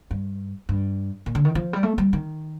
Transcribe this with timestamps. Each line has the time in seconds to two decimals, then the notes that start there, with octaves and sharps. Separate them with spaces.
0.11 G2
0.69 G2
1.26 A#2
1.35 D3
1.45 D#3
1.55 F3
1.73 G3
1.83 A3
1.98 G3
2.13 D#3